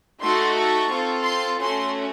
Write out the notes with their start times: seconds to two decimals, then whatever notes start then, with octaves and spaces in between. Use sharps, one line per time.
0.21 A3 D#4 F#4 A4 C6
0.56 C#6
0.90 C4 F4 A4
1.25 C6
1.60 A3 C#4 F#4 C6